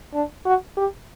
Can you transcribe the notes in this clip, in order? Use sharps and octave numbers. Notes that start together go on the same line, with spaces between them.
D4
F#4
G4